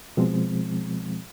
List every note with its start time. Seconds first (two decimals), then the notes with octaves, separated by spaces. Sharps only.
0.17 B2 F3 G#3 C4